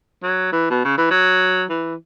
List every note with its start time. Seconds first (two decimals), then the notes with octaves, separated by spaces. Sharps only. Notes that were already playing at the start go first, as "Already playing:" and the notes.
0.23 F#3
0.53 E3
0.70 B2
0.85 C#3
0.98 E3
1.11 F#3
1.70 E3